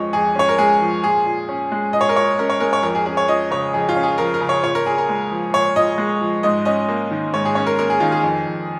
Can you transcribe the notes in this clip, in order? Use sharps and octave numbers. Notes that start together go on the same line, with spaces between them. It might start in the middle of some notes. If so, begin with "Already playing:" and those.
Already playing: F2 F3 G#3 C#4 C#5 D#5
F2 G#4
C#4 C#5
A#4
G#3 G#4
F3
A#2 G#4
A#2
C#4
G#3
A#2 D#5
C#5
A#4
A#2 C#5
C#4 A#4
C#5
G#3 A#4
C#5
F2 A#4
G#4
C#4 G#4
C#5
F3 D#5
C#3 C#5
F2 G#4
F4
C#4
G#4
F3 A#4
A#4
C#3
C#5
A#2 C#5
A#4
A#2 G#4
A#4
G#3
F3
A#2 C#5
A#2 D#5
G#3
F3
G#2 D#5
C#4 D#5
A#3
D#3
G#2 C#5
G#4
C#4 C#5
A#4
A#3 A#4
G#4
D#3 F4
G#4
F2
F2